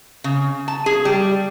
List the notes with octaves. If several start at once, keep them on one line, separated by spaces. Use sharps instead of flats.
C#3
A5
G#4
G3